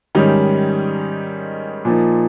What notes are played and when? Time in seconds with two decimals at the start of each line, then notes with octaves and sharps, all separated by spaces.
0.15 G#2 D#3 G3 C#4
1.85 A#2 F3 A#3 D#4